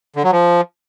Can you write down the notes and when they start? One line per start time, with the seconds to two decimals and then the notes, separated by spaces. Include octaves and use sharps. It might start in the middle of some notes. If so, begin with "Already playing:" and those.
0.16 D3
0.24 F#3
0.32 F3